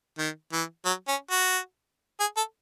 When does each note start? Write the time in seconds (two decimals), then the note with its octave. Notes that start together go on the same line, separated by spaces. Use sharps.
0.19 D#3
0.53 E3
0.85 F#3
1.08 C#4
1.31 F#4
2.20 G#4
2.37 A4